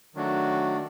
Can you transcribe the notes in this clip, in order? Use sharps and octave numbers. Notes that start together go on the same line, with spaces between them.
D#3 F#3 A3 D4 F#4